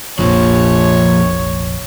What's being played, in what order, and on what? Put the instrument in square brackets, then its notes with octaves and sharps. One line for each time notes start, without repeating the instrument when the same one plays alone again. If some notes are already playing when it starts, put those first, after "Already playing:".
[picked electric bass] F1 A#1 [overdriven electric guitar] A#2 F3 [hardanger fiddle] C#5